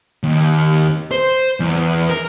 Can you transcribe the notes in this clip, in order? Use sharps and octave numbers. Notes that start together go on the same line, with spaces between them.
D#2
C5
E2
A#4